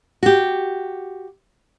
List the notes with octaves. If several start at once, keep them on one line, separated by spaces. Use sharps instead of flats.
F#4 G4